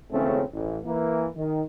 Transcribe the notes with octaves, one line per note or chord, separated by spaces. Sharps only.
G#1 E2 C#3 A3 C4 C#4
A1
E3 A#3 E4
D#3